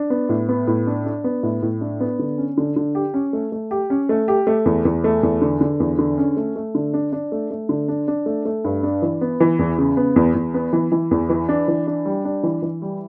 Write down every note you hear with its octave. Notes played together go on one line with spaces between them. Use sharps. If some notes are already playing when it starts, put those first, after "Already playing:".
Already playing: D4
B3
A2
B3
A2
D4
D4
B3
A2
A2
D4
B3
D3
C#4
D3
D3
G4
C#4
A3
A3
G4
C#4
A3
G4
A3
E2
E2
A3
E2
D3
D3
E2
D3
C#4
A3
A3
D3
D4
D4
A3
A3
D3
D4
D4
A3
A3
G2
D4
E3
B3
E3
E2
C#3
B3
E2
E2
B3
E3
E3
E2
E3
D4
E3
D4
G3
D4
E3
E3
G3